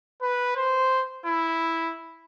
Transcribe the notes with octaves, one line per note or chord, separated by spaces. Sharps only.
B4
C5
E4